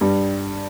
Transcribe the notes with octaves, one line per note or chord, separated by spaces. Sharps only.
G2 G3